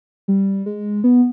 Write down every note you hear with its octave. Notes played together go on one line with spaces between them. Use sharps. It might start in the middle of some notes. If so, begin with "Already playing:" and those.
G3
G#3
B3